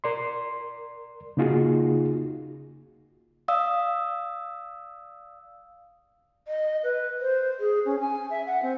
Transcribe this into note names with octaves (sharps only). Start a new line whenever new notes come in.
A#4 D5 C6
C#3 A#3 D#4 F4 F#4 G#4
D5 F5 D#6 E6
D#5
B4
C5
G#4
C#4
G#5
E5
F#5
C4